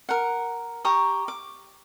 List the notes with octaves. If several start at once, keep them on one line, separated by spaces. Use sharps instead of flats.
A#4 F#5
G4 A#5 C#6 D#6
D6